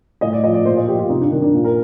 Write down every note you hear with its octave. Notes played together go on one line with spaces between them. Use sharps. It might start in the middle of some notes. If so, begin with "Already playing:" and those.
A2 D#5
D5
F3 D#5
D5
A#2 C5
D#5
F3 G4
F4
C3 D#4
D4
D#3 D4
D4
A#2
A#4